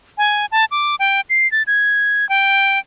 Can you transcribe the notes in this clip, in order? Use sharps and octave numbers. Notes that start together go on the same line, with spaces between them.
G#5
A5
D6
G5
C7
A6
G#6
G5